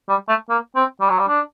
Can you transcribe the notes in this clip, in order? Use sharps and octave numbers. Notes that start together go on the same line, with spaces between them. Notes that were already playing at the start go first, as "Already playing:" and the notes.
G3
A3
A#3
C4
G3
F#3
G3
D4